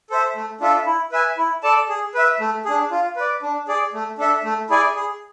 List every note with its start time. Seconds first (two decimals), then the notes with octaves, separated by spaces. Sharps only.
0.10 A4 C5 E5
0.36 A3
0.60 D4 F4 A4 E5
0.86 E4
1.12 B4 E5 G#5
1.37 E4
1.63 A4 D5 A5
1.89 G#4
2.14 B4 E5
2.40 A3
2.65 D4 G#4
2.91 F4
3.16 B4 D5
3.42 D4
3.68 G#4 D5
3.93 A3
4.18 D4 A4 E5
4.44 A3
4.70 E4 G#4 D5 G#5
4.95 G#4